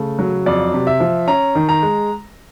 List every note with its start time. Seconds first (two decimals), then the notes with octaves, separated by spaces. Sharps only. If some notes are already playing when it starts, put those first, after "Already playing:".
Already playing: C#3 A3
0.19 F#3
0.46 F2 D5
0.73 C3
0.87 E5
1.00 F3
1.28 C#4 A#5
1.55 D#3
1.69 A#5
1.82 G#3